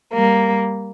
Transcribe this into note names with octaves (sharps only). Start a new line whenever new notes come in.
G3 A#3